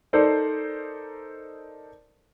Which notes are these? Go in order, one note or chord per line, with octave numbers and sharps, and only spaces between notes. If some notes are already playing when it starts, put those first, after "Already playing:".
D#4 A4 A#4 C5 D5